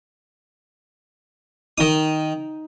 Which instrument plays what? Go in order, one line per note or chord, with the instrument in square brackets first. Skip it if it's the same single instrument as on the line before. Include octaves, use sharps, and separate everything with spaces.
[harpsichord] D#3 D#6 [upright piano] D#4